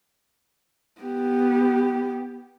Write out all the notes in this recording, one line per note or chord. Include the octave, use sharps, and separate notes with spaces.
B3 G4